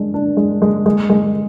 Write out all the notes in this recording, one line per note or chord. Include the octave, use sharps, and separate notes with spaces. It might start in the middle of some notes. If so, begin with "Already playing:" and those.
Already playing: G#3 D4
D4
G#3
G#3
G#3
G#3